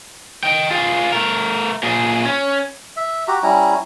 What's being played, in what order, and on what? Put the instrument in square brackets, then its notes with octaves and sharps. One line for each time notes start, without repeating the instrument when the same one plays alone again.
[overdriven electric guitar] D#5 G5
F4 G#4
A3 A#4
A#2 G#4
C#4
[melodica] E5
F#4 G4 A#5
G3 C#4 E4 A#5